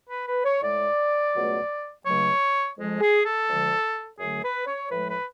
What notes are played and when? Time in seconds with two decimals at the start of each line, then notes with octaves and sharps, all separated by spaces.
0.08 B4
0.27 B4
0.44 C#5
0.61 A2 G#3 D5
1.34 C#2 B2 F#3 A3
2.05 C#2 C#3 F#3 A3 C#5
2.76 F2 F3 G#3
3.00 G#4
3.23 A4
3.47 D2 D3 F3 G#3
4.18 F#2 D3 F#3 A3 G#4
4.42 B4
4.66 C#5
4.90 A2 F3 G#3 B4
5.08 B4